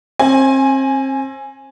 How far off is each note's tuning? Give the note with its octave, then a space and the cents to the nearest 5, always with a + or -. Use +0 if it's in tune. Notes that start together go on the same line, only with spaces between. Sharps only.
C4 +35 G#5 +0